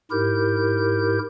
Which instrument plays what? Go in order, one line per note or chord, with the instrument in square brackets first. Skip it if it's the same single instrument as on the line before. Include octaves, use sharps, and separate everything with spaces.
[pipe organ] G#2 E4 G4 A#4 G6